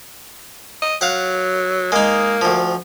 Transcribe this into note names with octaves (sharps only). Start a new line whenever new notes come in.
D#5
F#3 F5 F#5
G#3 A#3 D#4
D2 F3